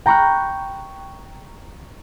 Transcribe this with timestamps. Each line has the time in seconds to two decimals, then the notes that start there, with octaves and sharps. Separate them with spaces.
0.06 G5 A#5 B5 C#6 F6 F#6